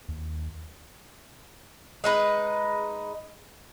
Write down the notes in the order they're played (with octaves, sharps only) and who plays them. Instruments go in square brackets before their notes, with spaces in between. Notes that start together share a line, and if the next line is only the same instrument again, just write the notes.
[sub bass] D#2
[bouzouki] G#3 D#4 B4